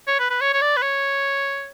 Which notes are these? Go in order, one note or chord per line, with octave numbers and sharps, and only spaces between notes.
C#5
B4
B4
C#5
C#5
D5
B4
C#5